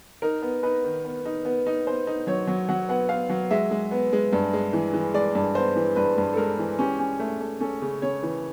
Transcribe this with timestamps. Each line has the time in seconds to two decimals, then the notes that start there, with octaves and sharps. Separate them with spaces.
0.22 D#4 A#4
0.42 B3
0.63 D#4 B4
0.84 D#3
1.05 B3
1.25 D#4
1.45 B3
1.67 D#4
1.87 B3 C5
2.07 D#4
2.27 F#3 C#5
2.47 F#3
2.69 F#3 F#5
2.89 B3 F#5
3.09 B3 F5
3.29 F#3
3.51 G#3 E5
3.71 G#3
3.91 B3
4.13 G#3
4.33 G2
4.53 G#3
4.73 E3
4.94 E3
5.14 G#3 D5
5.35 G2
5.55 B3 C5
5.76 E3
5.96 G2 B4
6.18 G2
6.33 A4
6.37 G#3 A#4
6.58 E3
6.79 C#4 G4
6.99 C#4
7.19 A3
7.41 A3
7.60 C#4 A4
7.82 C#3
8.02 C#3 C#5
8.23 E3